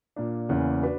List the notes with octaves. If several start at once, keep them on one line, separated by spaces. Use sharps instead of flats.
A#2 A#3 D4
E2 C#3 E3 A#3 C#4
D4 F#4 B4